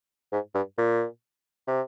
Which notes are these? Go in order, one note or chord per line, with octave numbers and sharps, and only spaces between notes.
G#2
G2
A#2
C3